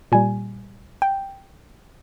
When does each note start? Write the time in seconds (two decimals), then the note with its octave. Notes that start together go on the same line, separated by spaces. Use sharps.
0.12 A#2 G3 G#5
1.02 G5